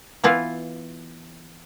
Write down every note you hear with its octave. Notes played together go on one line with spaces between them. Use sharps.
E3 B3 E4 F4